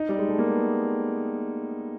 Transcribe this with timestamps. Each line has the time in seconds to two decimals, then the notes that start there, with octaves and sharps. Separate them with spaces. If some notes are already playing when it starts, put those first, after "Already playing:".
Already playing: D#4
0.09 G3
0.19 G#3
0.29 A3
0.39 A#3
0.49 B3